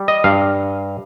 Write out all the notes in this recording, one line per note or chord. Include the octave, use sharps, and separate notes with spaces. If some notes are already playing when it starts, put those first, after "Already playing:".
Already playing: G3
D#5
G2 F5